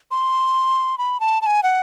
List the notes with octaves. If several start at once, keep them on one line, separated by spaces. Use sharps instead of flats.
C6
B5
A5
A5
G#5
F#5